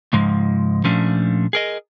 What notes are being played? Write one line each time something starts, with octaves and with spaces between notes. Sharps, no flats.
C#2 G#2 F3 G#3
A#2 F3 A3 C#4 D4
G#4 A#4 D#5